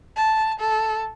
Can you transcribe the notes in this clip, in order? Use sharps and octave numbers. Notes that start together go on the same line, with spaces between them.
A5
A4